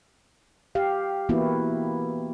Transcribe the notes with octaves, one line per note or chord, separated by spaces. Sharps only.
G4 F5
E3 A#3 B3 E4 F#4